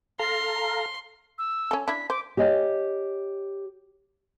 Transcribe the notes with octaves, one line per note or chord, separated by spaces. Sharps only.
A4 F5 A#5 C6
E6
C#4 A4
D4 E4 B6
C5 D6
G4 C#5 D#5 G#5